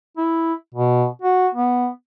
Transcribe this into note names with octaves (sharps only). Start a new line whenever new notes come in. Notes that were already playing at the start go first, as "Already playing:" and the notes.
E4
B2
F#4
B3